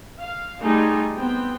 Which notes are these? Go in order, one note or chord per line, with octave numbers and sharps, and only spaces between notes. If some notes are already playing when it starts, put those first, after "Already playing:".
F5
G3 A3 D#4 F4 G#4
B3 C4 G5